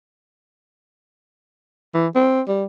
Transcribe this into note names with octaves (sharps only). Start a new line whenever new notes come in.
E3
C4
G3